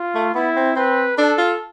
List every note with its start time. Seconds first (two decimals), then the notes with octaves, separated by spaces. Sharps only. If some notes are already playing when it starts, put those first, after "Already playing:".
Already playing: F4
0.15 A3
0.35 B3 E4
0.56 C4
0.76 C4 B4
1.17 D4 A4
1.38 F4